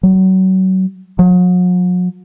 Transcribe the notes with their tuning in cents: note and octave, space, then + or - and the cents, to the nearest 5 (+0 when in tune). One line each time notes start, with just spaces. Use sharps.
F#3 +30
F#3 -45